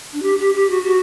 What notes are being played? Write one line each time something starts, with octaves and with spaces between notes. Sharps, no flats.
D4
G4
G4
G4
F#4
F#4